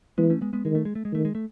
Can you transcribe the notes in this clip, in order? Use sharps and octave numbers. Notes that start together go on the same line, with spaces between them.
E3 G#3 B3
A3 C#4
G#3 B3
G#3 B3
D#3 G#3
A3
G#3
A3
G#3
D#3 A3
G#3
A3